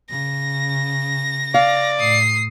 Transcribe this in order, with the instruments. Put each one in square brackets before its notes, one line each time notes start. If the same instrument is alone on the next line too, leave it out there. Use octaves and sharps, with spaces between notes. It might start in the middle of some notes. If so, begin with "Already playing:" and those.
[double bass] C#3 [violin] A#6
[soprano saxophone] D5 [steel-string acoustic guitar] F5
[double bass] A2 [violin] D#6 C7